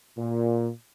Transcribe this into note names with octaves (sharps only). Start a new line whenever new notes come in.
A#2